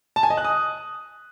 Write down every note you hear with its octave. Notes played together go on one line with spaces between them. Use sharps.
A5
G#5
D#5
F#6
D#6